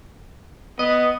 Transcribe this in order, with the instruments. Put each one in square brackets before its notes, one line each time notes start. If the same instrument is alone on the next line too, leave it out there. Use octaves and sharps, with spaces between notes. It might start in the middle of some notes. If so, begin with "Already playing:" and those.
[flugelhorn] B3 [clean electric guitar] D#5